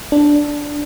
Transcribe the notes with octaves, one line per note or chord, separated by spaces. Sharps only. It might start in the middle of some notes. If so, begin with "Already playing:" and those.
D4